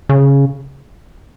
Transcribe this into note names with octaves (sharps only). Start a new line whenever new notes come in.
C#3